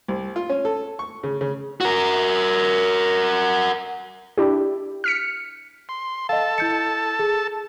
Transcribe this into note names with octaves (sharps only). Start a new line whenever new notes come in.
C2
F4
C#4
A4
C#6
C#3
C#3
F#4 A#4
D4 E4 G4
F6 B6 C#7
C6
A4 D#5 F5 A5
E4 G6 C#7
G#4